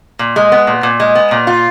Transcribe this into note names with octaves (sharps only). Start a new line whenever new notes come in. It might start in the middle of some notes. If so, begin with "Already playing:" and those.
A#2
G#3
B3
A#2
A#2
G#3
B3
A#2
F4